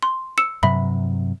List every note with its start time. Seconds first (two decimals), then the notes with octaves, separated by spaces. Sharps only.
0.03 C6
0.38 E6 C#7 E7
0.63 G2 C3 F#3 E5 B5